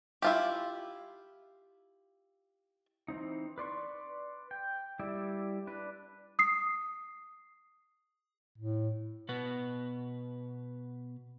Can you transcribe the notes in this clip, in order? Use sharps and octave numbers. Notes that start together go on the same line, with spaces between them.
E4 F4 G4
E3 C4 D#4
B4 D5 C6 C#6
G5
G3 E4 D5
D4 B4
D#6 C7
A2
B2 B3 B4